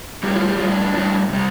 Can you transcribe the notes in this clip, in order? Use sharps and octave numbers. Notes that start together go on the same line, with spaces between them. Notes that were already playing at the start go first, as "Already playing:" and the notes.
A2 G3 G4
F4
G4
A2 G3 F4
D4
D4
A2 G3 D4
C3 G3